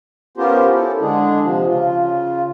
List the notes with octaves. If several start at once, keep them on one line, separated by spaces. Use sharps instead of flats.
B3 C#4 F4 G4 A#4 C5
E4 A4
D3 G#3 D4 G#4
C3 F3
C#3 F4